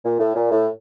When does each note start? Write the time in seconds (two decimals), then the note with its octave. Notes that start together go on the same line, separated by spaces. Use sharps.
0.05 A#2
0.20 A2
0.36 A#2
0.51 A2